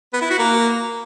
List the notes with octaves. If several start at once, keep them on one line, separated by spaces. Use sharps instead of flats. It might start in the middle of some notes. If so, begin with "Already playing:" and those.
B3
E4
F#4
A#3